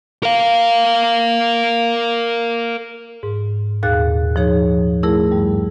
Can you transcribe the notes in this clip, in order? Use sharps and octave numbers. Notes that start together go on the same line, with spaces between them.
A#4 F5
G#2
D#2 A#2 G#4 F5 F#6 A6
F3 D#4 G#4 C#5
A3 E4 G#4 A#4
G2 G3